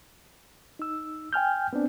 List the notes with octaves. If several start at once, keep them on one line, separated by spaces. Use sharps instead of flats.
D#4 E6
G5 G#5 F6 G6
B3 C4 D4